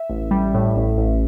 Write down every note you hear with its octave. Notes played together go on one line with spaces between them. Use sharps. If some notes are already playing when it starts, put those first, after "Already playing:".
Already playing: E5
A1
G3
A2
A1
A1